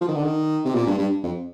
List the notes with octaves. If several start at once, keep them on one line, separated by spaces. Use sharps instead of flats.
F3
D#3
D3
D#3
C3
A#2
G2
G2
F2